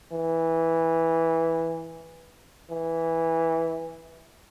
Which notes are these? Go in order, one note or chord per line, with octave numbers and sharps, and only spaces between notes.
E3
E3